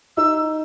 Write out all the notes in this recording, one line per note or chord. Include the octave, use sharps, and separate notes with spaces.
D#4 E6